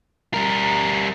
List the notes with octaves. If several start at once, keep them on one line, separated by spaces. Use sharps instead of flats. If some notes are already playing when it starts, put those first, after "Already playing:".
G3 A#4